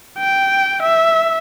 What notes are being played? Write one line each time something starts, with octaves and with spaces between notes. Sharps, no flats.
G5
E5